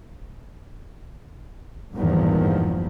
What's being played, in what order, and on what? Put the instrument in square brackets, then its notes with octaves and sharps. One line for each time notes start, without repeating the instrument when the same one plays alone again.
[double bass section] G#1 E2 G2 A#2 D#3 F3